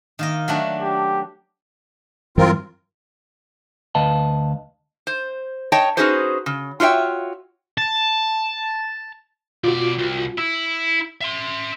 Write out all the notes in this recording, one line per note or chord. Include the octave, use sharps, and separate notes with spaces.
D#3 A#3 D#5
F#3 A3 D4
G4
G2 E3 F#3 C4 F4 A#4
D2 B4 D#5 F5 A5
C5
C#5 D#5 G5 A5
C#4 D#4 F#4 G#4 B4 C5
C#3
F4 F#4 C#5 E5 G5
A5
B2 F4 F#4 D5
C2
E4 E6
E5 C6